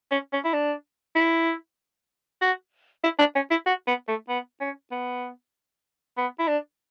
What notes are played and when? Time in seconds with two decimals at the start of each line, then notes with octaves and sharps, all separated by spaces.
0.11 C#4
0.33 C#4
0.45 E4
0.53 D4
1.15 E4
2.42 F#4
3.04 E4
3.19 D4
3.36 C#4
3.51 E4
3.66 F#4
3.87 B3
4.08 A3
4.29 B3
4.61 C#4
4.91 B3
6.17 B3
6.39 E4
6.48 D4